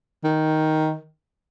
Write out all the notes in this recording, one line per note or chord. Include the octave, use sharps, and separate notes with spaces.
D#3